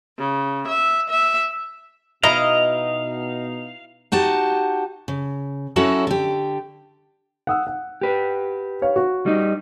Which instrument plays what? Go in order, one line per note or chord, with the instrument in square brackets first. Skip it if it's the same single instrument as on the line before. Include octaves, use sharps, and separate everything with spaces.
[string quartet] C#3
E5
E5
[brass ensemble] B2 D#4 [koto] E4 A#5 [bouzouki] D#5 [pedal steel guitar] F5
[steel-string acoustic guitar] D#4 F#4 G4 A5
C#3
F#3 C#4 E4 F#4 A4 A#4
D3 G4
[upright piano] F#5 D#6 E6
F#5
[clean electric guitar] G4 B4
[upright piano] C#5 F5
F#4
[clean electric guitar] G3 D#4